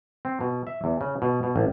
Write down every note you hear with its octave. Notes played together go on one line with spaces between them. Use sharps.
C4
B2
E5
E2
C#3
B2
B2
A1